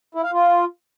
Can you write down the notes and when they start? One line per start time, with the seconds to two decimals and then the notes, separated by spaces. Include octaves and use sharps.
0.15 E4
0.24 F5
0.33 F4